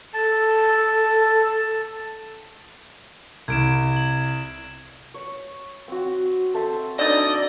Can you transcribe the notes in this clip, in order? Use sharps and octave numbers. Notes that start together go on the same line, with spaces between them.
A4 A5
C2 G#6 D7 E7
F#7
C#5
C4 F#4
A4 C5 E5
D3 D#4 D5 D#5